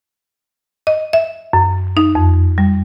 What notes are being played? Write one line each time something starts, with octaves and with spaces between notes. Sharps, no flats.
D#5
E5
F#2
D#4
F2
G3